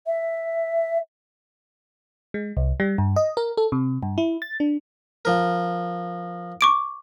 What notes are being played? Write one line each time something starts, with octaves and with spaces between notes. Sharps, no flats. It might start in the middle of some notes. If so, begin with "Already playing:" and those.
E5
G#3
C2
G3
G2
D#5
A#4
A4
C3
G2
E4
A6
D4
F3 A#4
C#6 D6 D7